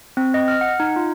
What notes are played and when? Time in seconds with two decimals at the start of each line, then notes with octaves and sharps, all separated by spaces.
0.17 C4
0.34 D#5
0.48 F6
0.61 F#5
0.80 D#4
0.96 F4